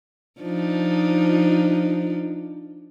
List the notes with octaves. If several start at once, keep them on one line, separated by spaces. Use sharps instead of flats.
F3 D4 D#4